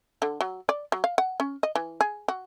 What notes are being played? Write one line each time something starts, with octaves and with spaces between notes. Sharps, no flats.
D3
F#3
D5
F#3
F5
F#5
C#4
D#5
E3
G#4
F#4